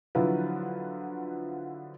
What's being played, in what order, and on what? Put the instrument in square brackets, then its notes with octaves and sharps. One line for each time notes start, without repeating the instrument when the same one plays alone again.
[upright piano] D3 F3 F#3 E4 F4 B4